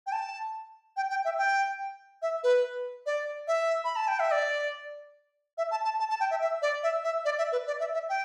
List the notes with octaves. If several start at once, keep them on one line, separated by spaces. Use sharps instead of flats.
G5
A5
G5
G5
E5
G5
E5
B4
D5
E5
B5
A5
G5
E5
D5
E5
A5
A5
A5
A5
G5
E5
E5
D5
E5
E5
D5
E5
B4
D5
E5
E5
G5